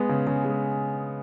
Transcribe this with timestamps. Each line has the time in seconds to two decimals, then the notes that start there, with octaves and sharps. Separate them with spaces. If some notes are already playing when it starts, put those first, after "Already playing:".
Already playing: G#3 B3
0.09 C#3
0.27 C#3
0.45 G#3